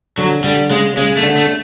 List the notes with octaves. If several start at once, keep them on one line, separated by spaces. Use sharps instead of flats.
D3 F#3
D3 G3
C#3 G#3
C#3 G#3
A3
D3
A3